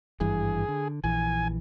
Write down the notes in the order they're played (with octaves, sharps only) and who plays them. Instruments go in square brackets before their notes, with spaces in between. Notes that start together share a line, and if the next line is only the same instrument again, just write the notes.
[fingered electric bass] G#1 G2 E3 [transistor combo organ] G#4
[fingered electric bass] D3
[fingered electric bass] A#1 E3 [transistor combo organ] G#5